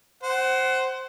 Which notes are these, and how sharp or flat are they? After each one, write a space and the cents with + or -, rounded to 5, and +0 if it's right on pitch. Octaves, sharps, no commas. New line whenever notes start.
C5 +0 F#5 +25